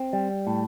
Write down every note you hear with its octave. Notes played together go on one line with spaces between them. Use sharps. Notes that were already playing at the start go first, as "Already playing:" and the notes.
Already playing: C4
G3
A2